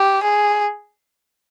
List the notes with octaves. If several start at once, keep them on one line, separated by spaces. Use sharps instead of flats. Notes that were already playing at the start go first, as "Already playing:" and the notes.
Already playing: G4
G#4